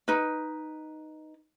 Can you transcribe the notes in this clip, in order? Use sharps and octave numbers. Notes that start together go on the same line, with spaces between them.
D#4 B4